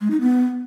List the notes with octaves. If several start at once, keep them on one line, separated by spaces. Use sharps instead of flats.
G#3
D#4
B3